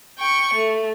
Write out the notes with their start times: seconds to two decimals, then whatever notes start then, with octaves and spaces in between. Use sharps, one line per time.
0.19 G5 C#6
0.54 A3